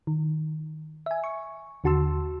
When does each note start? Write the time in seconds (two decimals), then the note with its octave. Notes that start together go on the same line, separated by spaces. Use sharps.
0.07 D#3
1.06 E5 G#5
1.24 C#6
1.84 D#2 D3 F#4 A5 C6 E6